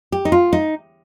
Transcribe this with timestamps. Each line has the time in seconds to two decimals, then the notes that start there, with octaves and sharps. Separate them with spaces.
0.12 G4
0.25 D#4
0.32 F4
0.53 D#4